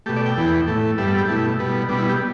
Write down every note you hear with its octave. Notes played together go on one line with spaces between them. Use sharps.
B2 A3 G4
D5
G5
E2 E3 B3
A2 A3
G2 G3 B3 E5
A4
G4
B2 A3 E4
B2 G3 B3
B2 G3 B3 D4
E4
G4